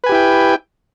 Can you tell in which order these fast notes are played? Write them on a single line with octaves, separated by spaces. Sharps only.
B4 G#5 G4 E4 G5